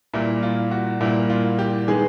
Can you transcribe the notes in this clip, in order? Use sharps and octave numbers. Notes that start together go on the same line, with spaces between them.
A#2 G3 A#3 E4
F4
F#4
A#2 G3 A#3 E4
F4
G4
D#3 G#3 B3 G#4